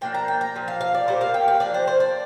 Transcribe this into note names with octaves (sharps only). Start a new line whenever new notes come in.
F3 A#3 D4 G5
A#5
G5
A#5
A#2 F3
F5
F5
D5
A#2 G3 A#3 C5
F5
G5
F5
F3 A#3 D4 D5
C5
C5
D5